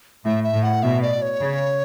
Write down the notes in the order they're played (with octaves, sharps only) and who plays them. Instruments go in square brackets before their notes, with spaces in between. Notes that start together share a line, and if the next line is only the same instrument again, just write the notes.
[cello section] A2 [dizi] E5
[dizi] E5
[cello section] A2
[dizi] F#5
[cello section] B2 [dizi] E5
[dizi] D5
C#5
[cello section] C#3